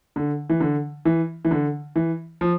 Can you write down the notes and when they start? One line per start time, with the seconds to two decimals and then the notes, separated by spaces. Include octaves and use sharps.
0.16 D3
0.50 E3
0.60 D3
1.05 E3
1.45 E3
1.51 D3
1.96 E3
2.41 F3